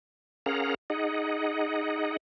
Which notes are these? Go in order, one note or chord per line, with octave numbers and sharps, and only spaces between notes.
C#4 G#4 A#4 F5 F#5 A#5
D#4 G#4 D#5 F#5